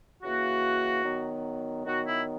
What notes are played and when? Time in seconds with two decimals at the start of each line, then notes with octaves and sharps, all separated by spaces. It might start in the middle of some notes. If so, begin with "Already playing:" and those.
0.23 C#3 E3 A#3 F#4
1.04 D#3 F#3 B3
1.85 D#3 F#3 B3 F#4
2.05 E4